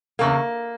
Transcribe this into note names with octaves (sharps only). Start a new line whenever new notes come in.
E2 C#3 A#3